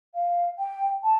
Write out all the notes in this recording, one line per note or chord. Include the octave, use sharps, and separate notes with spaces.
F5
G5
A5